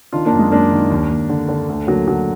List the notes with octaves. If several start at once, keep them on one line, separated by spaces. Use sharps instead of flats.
D#3 D4 F4
A#3 D4
F#2
G#3
F#2 A#3 D4
D#3
D#2
D#2
D3
D3
D2
D3 F#3 A#3
D3 F#3